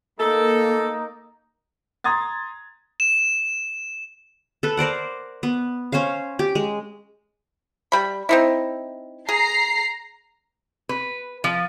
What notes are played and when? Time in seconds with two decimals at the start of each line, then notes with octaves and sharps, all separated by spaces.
0.20 A#3 D#4 A4
2.04 A#5 C6 D#6 G#6 A6
3.00 E7
4.63 A4 B4
4.77 A#4 C5 D5 F#5
5.43 B3
5.92 C#4 C5 C#5 F5
6.39 G4
6.55 G#3
7.92 G3 B5
8.29 C4 D#4 E4
9.29 G#4 A#5 C7
10.89 B4
11.44 F3